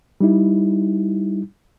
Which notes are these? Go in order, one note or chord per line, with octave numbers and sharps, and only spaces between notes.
G3 D#4 E4